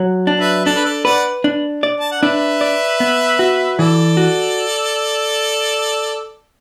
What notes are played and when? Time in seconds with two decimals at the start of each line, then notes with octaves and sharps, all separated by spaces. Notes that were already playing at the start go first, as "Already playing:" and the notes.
Already playing: F#3
0.27 D4
0.40 B4 E5
0.65 D4 A4 D5
0.76 B4
0.85 A4 D5
1.05 B4 D5 F#5
1.44 D4
1.83 D5
2.00 A5
2.12 F#5
2.22 D4 B4 E5
2.61 D5
3.00 B3
3.39 F#4
3.79 E3 A4 D5
4.17 F#4